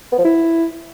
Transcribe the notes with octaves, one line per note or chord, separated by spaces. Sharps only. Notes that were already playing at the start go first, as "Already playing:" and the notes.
B3
F3
E4